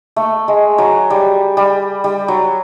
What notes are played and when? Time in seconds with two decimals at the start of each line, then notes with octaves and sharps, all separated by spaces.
0.16 A3
0.48 G#3
0.78 F#3
1.10 G3
1.57 G3
2.04 G3
2.28 F#3